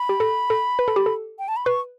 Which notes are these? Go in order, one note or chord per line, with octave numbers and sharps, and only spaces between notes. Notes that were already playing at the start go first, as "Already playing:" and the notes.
Already playing: B5
G4
A4
A4
B4
A4
G4
A4
G5
A5
B5
B4 C#6